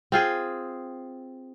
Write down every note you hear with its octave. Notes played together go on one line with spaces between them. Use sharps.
C4 F4 G#4